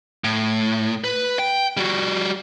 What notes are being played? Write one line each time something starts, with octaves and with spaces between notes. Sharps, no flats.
A2
B4
G5
G3 F#4